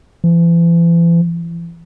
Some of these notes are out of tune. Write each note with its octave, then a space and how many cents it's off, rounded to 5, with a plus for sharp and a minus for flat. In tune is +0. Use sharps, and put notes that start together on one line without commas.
E3 +40